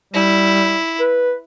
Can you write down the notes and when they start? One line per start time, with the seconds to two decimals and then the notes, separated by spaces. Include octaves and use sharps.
0.14 G3 E4
0.99 B4